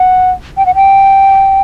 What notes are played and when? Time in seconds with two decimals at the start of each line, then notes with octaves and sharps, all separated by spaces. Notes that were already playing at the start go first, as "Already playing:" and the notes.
Already playing: F#5
0.57 G5
0.66 F#5
0.75 G5